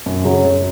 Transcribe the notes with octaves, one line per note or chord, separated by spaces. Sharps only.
F#2
C#3 F#3
F#2